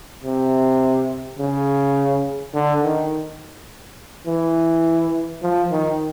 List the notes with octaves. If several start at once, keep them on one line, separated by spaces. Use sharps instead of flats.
C3
C#3
D3
D#3
E3
F3
D#3